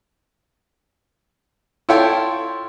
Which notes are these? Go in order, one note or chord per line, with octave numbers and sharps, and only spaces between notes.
E4 F4 A4 C#5 G5 C6